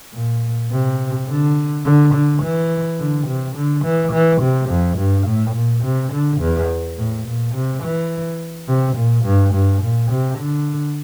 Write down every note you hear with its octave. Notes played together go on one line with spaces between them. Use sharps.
A#2
C3
D3
D3
D3
E3
D3
C3
D3
E3
E3
C3
F2
G2
A2
A#2
C3
D3
E2
A2
A#2
C3
E3
C3
A#2
G2
G2
A#2
C3
D3